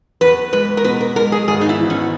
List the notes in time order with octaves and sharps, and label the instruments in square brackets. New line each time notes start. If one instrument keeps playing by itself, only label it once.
[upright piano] E2 [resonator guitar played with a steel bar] B4
[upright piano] G#3 [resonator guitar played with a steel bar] B4
[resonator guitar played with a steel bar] A#4
[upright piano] B2 [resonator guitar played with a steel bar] B4
[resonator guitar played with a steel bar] A#4
[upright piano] G#3 [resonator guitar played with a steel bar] A#4
[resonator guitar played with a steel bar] G#4
[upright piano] G#1 [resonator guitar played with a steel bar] G#4
[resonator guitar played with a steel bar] D#4
E4
[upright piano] E3
[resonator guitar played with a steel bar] C#4